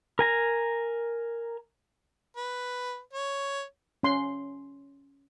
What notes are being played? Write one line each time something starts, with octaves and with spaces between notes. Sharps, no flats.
A#4 G#5 A#5
B4
C#5
C#4 C6